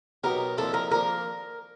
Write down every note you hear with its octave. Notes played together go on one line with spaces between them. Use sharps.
B2 F#3 B3 D#4 G4 A#4
A#2 F3 G#3 C4 E4 A4
A#4
F3 A#3 D4 A#4